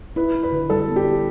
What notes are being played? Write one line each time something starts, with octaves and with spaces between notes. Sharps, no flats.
E4 B4
E4
B4
D3
G3 A4
B3
G4
E4